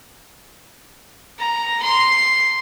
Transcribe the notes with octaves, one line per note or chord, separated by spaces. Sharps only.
A#5
C6